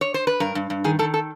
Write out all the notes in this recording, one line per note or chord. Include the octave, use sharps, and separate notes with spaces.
C#5
C5
B4
G2 A#4
G2
G2
D#3 G#4
D#3 A4
A4